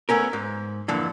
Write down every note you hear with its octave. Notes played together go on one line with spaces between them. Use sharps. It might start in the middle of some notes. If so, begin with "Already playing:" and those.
A3 B3 C#4 A#4
G#2
F2 A#2 D3 E3